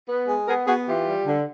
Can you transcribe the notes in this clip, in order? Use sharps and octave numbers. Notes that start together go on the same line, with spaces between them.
B3
G#3
B3 G#4 A#4
B3 F#4 G#4
E3 F4 G4
G3
D3